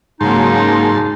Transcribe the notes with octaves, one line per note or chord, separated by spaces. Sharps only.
G#2 C#3 F#3 A#3 D#4 A5 C6